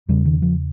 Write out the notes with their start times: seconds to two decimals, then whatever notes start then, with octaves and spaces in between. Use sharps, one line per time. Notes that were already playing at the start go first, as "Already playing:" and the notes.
0.08 E2 C#3 G3
0.25 D#3
0.42 F3